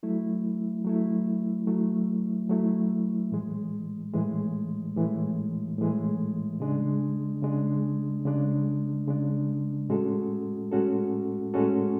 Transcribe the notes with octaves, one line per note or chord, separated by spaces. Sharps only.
F#3 A3 E4
F#3 A3 E4
F#3 A3 E4
F#3 A3 E4
A2 E3 G#3
A2 E3 G#3
A2 E3 G#3
A2 E3 G#3
C#3 G#3 D4
C#3 G#3 D4
C#3 G#3 D4
C#3 G#3 D4
A2 G#3 C#4 F#4 A4
A2 G#3 C#4 F#4 A4
A2 G#3 C#4 F#4 A4